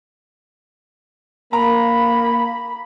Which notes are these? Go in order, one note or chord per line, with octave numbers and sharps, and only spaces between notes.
A#3 A#5 B5